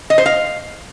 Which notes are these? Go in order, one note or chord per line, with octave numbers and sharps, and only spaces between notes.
D#5
C5
F5